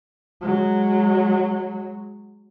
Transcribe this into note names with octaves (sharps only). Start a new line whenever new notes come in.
F#3 G#3